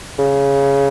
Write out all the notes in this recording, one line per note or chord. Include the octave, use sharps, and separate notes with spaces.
C#3